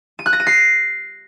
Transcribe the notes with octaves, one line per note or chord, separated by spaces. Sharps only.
D#7
F#6
A#6
D#7
C7